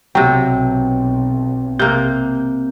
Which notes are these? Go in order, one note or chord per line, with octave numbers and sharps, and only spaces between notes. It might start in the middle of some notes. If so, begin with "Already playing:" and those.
B1 C3 F#3 G5
C3 A#3 G6